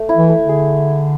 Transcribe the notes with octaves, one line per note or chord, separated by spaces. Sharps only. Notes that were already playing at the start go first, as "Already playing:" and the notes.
Already playing: A3
E4
E3
A3
D3
G#4